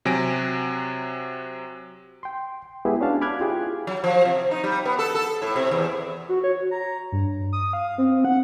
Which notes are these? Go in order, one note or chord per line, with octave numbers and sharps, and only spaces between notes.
C3 F#3 G#5 A#6 D7
G5 C6
G#3 B3 E4 G4 G#4 B4
C#4 D4 F#4 F5 A5
B5 D6 F6 F#6 G#6
E4 F4 G4 G#4
F#3
F3
C3
D#4
G3
B3
A4
A4
A2
C3
E2
F#4
C#5
A#5
G2
D#6
F5
C4
F#5